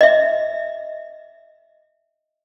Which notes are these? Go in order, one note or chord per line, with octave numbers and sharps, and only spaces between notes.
D#5 E5